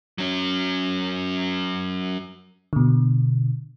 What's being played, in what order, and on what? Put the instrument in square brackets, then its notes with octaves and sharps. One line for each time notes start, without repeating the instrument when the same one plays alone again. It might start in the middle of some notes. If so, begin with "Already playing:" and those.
[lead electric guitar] F#3 C#4
[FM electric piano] B2 D3